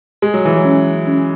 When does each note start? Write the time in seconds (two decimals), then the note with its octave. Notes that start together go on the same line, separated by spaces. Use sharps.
0.22 G#3 G#4
0.34 F#3
0.45 E3
0.56 F#3
0.65 C#4
1.07 C#4